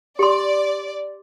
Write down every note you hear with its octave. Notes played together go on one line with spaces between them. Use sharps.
G4 D5 C6